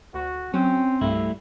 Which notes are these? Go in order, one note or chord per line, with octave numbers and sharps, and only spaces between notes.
D2 F#4
F#3 C4 C#4 G5
C2 G2 G3 A3 E4